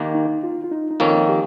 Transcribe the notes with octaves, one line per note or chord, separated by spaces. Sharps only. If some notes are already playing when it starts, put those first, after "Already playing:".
Already playing: D#2 D#3 A#3
D#4
F4
F4
D#4
D#4
F2 D#3 A#3 C#4 F4
G4